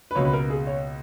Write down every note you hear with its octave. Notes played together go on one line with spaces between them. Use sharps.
B4
C#2 B2 A#3 C#5
B4
A#4
G#4
C#5